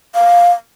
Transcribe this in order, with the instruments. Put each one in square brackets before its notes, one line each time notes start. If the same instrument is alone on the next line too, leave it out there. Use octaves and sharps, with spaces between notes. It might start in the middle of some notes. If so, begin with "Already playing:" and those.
[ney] F5